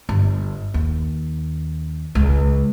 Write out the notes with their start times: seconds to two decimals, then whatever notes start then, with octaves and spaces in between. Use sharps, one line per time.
0.09 G1
0.74 D#2
2.15 C#2